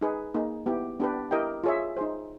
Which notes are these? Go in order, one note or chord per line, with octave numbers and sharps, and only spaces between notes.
D#4 G#4 B4
A#3 D#4 G#4
B3 E4 G4
B3 D4 G4 B4
E4 G4 A#4 D#5 G5
F4 G#4 C#5 E5
D#4 G#4 C5